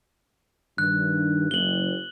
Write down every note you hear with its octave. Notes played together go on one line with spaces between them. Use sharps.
G2 D#3 F#6
F#1 F#7 G7